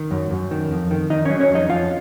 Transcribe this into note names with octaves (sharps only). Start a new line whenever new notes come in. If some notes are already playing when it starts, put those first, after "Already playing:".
Already playing: D#3
F#2
F#2
D#3
F2
D#3
D#3 D#4 D#5
F#3 C#4 C#5
C#4 C#5
F2
D#4 D#5
F2 F4 F5